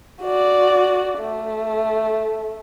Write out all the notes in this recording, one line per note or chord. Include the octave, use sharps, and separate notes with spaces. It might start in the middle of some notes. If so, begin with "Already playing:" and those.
F#4 D5
A3